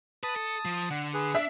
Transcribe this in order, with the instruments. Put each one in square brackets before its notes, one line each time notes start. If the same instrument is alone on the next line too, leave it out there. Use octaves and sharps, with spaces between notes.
[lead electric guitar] B4 [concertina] A5 D#6
[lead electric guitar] A4
F3
[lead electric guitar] D3 [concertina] F#5
[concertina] G#4 B4
[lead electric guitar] D4 [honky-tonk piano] E5